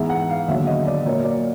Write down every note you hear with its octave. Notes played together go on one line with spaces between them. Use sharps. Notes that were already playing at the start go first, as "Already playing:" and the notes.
Already playing: G#2 E3 G#3 B3 E5
F#5
F5
D#2 D3 F#3 B3 E5
D#5
D5
A#2 F#3 A#3 C#5
D5